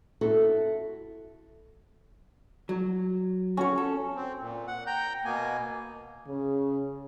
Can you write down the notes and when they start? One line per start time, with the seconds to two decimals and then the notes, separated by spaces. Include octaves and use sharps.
0.21 E4 F#4 A4
2.69 F#3
3.57 C#4 F#4 C#5
3.78 A4
4.16 C4
4.39 A#2
4.67 F#5
4.87 G5 A#5 G6
5.25 B2 A#3 B3 G#5
6.28 C#3